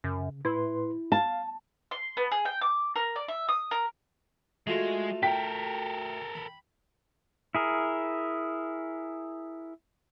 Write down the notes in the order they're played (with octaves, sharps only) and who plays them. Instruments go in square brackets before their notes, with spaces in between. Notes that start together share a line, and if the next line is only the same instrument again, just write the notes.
[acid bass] F#2 [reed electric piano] C#3
[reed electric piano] A2 B4 C6 [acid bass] E4
[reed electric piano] F5 [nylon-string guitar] A5
[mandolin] C6
B3
G#4
G5
D6
A#4
D5
E5
D#6
A#4
[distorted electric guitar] G#3 [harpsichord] A3 F4 F#4
[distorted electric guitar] A4 A#4 [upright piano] G5 B6
[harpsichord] B5
[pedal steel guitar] E4 G#4 A#4